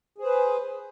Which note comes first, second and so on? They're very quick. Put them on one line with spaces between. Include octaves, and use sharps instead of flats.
G#4 C5 B4